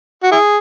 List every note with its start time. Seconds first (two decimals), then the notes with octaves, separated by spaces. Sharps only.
0.23 F#4
0.32 E4 G#4